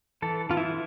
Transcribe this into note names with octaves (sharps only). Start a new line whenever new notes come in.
E3 A4
E3 F4
E4